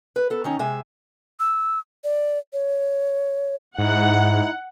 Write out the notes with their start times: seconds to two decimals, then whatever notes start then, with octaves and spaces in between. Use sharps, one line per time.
0.16 B4
0.30 B3 A4
0.44 D#3 C#4 D#4
0.59 C3 G#3 E5 G#5
1.40 E6
2.04 D5
2.53 C#5
3.78 G#2 D#4 E4 F#5